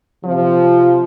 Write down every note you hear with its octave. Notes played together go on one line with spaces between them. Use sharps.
C3 F3